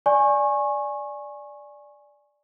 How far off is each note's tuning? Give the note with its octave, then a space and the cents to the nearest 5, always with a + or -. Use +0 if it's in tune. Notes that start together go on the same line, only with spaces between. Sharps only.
D5 +0 G#5 +0 C#6 -25